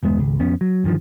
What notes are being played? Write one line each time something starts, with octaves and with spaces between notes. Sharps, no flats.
G1 E2 G#3 B3
G#1 C#2
F2 B3 C#4
F#3
G1 G2 D#3 F3